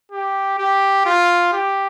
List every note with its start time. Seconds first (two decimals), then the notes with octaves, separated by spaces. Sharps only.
0.12 G4
0.59 G4
1.06 F4
1.53 G4